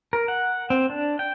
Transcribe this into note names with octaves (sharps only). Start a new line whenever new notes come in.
A#4
F#5
C4
D4
G5